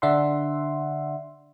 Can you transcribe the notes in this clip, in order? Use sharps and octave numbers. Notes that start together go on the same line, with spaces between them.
D3 D4 E5 F#5 C6